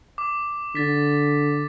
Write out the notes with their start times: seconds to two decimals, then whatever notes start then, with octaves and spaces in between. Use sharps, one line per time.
0.18 D6
0.75 D3 A6 B6